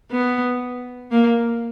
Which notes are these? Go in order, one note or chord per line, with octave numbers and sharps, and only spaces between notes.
B3
A#3